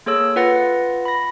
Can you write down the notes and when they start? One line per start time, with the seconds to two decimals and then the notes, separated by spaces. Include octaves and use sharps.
0.06 A#3 G#4 A4 C#5 E6
0.36 F4 B4 F#5 A6 A#6
1.05 B5 A#6